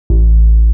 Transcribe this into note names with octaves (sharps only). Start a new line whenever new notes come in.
A1